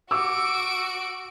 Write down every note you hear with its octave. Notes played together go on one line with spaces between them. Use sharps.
F#4 D6 E6 D7